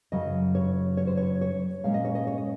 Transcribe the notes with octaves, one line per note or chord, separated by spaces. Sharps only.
F#2 C#3 F#3 D#5
C#5
C#5
C5
C#5
C#5
A#2 G#3 C#4 F5
D#5
C#5
D#5
C#5
D#5